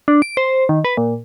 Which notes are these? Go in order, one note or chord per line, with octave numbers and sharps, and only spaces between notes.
D4
D7
C5
D#3
B4
A#2